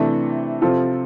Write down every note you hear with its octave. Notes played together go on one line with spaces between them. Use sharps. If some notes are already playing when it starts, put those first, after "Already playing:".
Already playing: C3 E3 A3 D4 A4
C3 F3 C4 F4 A4